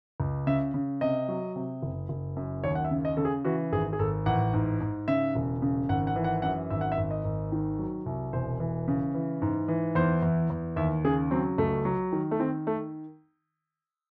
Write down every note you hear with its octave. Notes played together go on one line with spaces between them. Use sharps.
C#2
C#3 E5
C#3
C3 D#5
F#3
C3
F#1
F#1
F#2
D#2 C#5
F#5
E5
C#3
D#5
C#3 A4
G#4
E3 F#4
G#1 G#4
G#4
G#1 A4
A1 F#5
G#2
G#2
C#3 E5
E1
C#3
G#1 F#5
F#5
E3
F#5
F#2 F#5
G#1 E5
F#5
E5
G#1
D#5
G#1
D#3
F#3
C2
E1 C5
E3
C#3
E3
G#2
E3
E2 C5
E2
E2
D#2 E5
C#3 G#4
F#3 C4
C#2 A3
F#3
D#3
A3
D#3 C4
A3